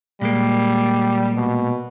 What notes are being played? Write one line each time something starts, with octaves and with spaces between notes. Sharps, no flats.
A#2 G3 G#3 A#3
B2